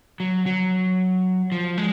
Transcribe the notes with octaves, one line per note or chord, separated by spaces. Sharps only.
F#3
F#3
F3
G#3